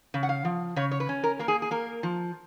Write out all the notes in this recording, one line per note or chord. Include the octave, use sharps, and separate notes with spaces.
C#3
F#5
F5
F3
C#3 C#5
C#5
B4
C#4
A#4
A#3 A#4
G#4
G#4
A#3 A#4
F3